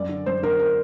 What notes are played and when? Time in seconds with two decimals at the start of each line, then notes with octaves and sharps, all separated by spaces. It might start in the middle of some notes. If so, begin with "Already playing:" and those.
Already playing: F#2 D5
0.09 D3
0.26 F#2 C5
0.43 D3 A#4
0.60 A#4